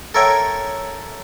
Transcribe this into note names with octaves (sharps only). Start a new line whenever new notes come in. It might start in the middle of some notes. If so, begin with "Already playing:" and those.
A4 A#4 C#5 E5 G5